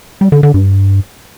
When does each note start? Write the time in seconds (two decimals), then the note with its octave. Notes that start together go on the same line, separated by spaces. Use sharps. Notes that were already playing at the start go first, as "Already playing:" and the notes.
0.21 G3
0.32 D3
0.43 D3
0.54 G2